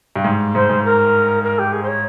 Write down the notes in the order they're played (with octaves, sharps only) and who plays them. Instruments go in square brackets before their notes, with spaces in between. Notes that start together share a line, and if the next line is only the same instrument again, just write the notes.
[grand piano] G2
G#2
[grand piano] G#2 [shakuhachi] C5
[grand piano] G#2
[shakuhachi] A#4
A#4
G4
G#4
C5
C#5